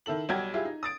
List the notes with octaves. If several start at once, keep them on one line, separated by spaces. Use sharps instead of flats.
D#3 E4 A4 F#7
B1 G3 F#4 G5 G#6
E4 F4 G4 G#4
D#4
D#6 A6 D7